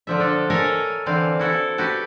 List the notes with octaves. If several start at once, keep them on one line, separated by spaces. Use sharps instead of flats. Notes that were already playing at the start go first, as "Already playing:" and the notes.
D3 F3 E5
D4 A4
A4 A#4 C#5 D#5 E5 G#5
D3 E3 C4 F5
E4 F#4 A4
F#4 G4 B4 A5